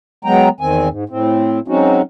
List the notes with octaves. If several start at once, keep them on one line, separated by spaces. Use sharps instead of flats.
F#3 G#3 B3 G5 A#5
E2 D#3 C4 G#5
G#2
A2 C4
F#3 G#3 C4 C#4 D#4 F#4